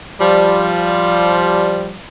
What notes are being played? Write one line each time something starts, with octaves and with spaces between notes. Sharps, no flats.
F3 G3